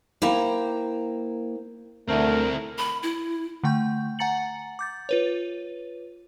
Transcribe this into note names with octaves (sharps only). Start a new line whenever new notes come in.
A#3 E4 C5 G5 A#5
D2 A3 C4 E4 A#4
B5
E4
D3 A3 G5 C#6 G6
F#5 G#5 A#5 A6 C#7 F#7
D6 G6 A6
F4 B4 C#5